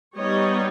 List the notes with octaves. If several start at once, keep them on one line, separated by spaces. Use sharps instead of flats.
G3 B3 D#4 C#5 D#5